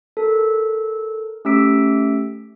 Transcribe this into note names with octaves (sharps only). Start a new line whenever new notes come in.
A4 A#4
A3 C#4 G4 E6 B6 D7